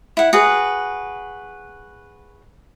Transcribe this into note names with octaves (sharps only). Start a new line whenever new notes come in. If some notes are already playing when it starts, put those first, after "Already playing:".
E4 F#5
F#4 G#4 B4